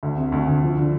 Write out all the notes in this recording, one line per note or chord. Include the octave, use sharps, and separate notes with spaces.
D2
C3
D2
D2
F3
D3